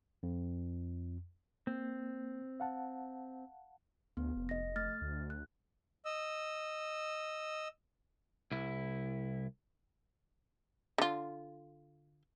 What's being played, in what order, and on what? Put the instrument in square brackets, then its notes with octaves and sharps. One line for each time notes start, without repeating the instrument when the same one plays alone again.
[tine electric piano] F2
[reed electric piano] A#3 [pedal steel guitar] C4
[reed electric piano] F5 F#5 A5
[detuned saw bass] D2 [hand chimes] B3
[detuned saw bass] F1
[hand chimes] D#5 A#6
A3 F6 A6
[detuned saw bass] D2
[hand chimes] F#6
[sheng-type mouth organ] D#5 E6
[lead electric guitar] C2 E4
[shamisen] D3 F4